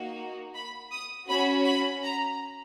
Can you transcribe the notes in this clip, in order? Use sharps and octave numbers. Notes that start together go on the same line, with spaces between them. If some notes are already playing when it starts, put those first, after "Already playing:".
Already playing: A#3 D#4 F#4
B5
D#6
C#4 F#4 B5
B5
A#5